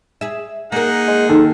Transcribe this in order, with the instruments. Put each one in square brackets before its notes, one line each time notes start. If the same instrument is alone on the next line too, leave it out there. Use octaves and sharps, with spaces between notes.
[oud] G#4 E5
[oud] A#3 A#4 [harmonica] D#4 G#4 F#5
[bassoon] G#3
[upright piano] D#3 [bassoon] A4